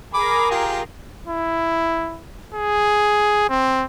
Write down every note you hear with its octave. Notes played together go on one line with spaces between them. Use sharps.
G#4 A#4 B5 D6
F4 G4
E4
G#4
C4